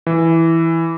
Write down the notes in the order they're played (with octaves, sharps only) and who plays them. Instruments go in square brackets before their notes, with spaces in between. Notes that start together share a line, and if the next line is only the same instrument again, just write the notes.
[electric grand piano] E3